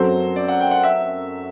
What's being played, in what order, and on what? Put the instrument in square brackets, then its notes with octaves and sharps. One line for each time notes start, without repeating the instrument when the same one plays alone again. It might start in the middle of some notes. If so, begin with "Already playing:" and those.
Already playing: [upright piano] F#2 F#3 C4 F#4 A4 [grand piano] C5
[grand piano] D5
F#5
G5
F#5
E5